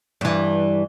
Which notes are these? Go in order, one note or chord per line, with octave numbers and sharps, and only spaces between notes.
G2 E3